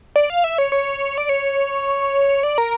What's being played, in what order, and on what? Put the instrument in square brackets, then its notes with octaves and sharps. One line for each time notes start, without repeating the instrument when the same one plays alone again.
[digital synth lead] D5
F5
E5
C#5
C#5
D5
C#5
D5
A#4